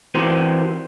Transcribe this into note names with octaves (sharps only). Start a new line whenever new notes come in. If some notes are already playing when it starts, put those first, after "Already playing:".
E3 C4 F#4 G4 A#4 C5